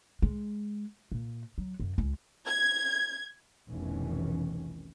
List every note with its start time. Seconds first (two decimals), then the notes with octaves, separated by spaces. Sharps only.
0.22 G#3
1.12 A#2
1.58 F#3
1.80 F#2
1.98 C#2
2.47 G#6
3.69 F1 C2 B2 D#3 E3 C#4